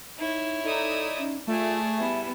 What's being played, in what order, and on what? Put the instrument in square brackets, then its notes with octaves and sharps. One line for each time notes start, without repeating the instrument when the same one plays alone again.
[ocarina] D#4 [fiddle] E4 C#5
[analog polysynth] D#4 [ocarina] A4 [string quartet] D5 E5 D#6
[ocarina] C#4
[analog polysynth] A3 [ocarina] F4 [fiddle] G#4 A5 [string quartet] D5
[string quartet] G3 B3 E4 [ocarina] E5